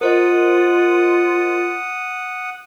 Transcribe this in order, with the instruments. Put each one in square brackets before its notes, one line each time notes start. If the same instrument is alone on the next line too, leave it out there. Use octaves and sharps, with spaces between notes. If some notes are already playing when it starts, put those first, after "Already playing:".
[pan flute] F4 [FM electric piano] A#4 C5 D#5 [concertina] F#5 D#6